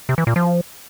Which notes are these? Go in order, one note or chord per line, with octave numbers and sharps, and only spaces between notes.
C3
E3
A#2
F3